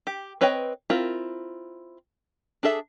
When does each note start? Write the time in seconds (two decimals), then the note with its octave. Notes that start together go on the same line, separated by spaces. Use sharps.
0.07 G4
0.41 C4 B4 C#5 D#5 G5
0.90 C4 E4 F4 A#4
2.63 D4 G#4 A4 E5